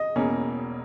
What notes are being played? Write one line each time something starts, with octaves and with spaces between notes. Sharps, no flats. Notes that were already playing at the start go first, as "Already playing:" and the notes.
Already playing: D#5
E1 E2 B2 A#3 C#4